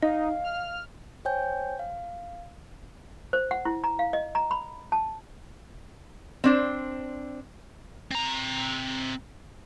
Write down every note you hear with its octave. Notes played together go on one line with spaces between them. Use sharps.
D#4 D#5 F5
F6
C5 C#5 G5 G#5 G6
F5
C5
F#5
E4
A#5
F5
D#5
A#5
B5
A5
C4 D4 C5
C4 A#5